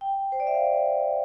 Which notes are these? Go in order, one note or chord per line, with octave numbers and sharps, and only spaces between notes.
G5
C5
D5
E5
F5